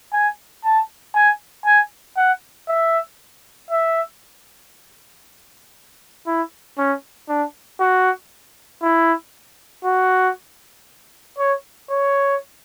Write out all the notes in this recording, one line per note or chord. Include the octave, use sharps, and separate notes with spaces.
G#5
A5
G#5
G#5
F#5
E5
E5
E4
C#4
D4
F#4
E4
F#4
C#5
C#5